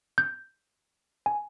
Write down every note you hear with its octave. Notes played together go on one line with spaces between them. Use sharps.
G6
G#5